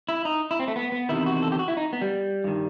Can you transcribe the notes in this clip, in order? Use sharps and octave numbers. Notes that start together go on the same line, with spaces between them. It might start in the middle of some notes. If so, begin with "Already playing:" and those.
E4
D#4
E4
C4
A3
B3
B3
E2 C3 D#3 E4
F#4
A4
G4
F#4
E4
D#4
B3
G3
G2 D#3